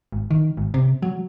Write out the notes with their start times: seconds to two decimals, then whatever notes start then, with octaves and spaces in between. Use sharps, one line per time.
0.12 G#1
0.31 D#3
0.57 G#1
0.74 C3
1.02 F#3